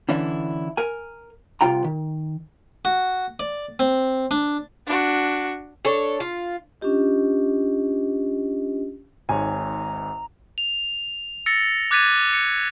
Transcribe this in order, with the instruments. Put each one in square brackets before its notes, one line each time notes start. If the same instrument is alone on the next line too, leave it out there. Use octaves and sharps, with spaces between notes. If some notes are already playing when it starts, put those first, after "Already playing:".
[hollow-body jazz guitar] D3 E3 C#4 D4 E4
A#4 G#5
C2 F2 C3 F4 G5 A#5
D#3
[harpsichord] F#4
D5
C4
D4
[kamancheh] D4 F#4
[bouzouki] D4 A4 C#5
F4
[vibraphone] C#4 D4 F4 G4 D#5
[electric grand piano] G#1 G#2 C#5 [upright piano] G#5 [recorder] A#5
[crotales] F7
E6 A6 A#6 C#7
D6 F#6 G#6 A6 B6 D#7
C#7